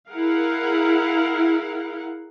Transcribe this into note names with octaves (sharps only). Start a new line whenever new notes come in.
E4 G#4 A#4 F5 F#5